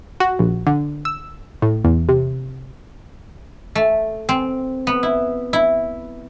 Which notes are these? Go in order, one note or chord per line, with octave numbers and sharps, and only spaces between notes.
F#4
A#1
D3
E6
A2
E2
C3
A3
C4
B3
E4
E4